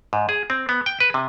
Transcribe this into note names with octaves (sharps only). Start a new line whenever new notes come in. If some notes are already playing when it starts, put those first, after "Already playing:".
G#2
G#4
C4
B3
G5
B4
C3